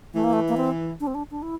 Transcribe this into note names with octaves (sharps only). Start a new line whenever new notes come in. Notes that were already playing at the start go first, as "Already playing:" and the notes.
E3 A3
A#3
A3
A#3
C4
D4
C4
D4
D4
E4